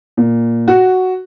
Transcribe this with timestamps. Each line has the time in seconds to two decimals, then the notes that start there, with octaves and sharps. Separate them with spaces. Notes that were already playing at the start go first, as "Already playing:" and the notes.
0.17 A#2
0.68 F#4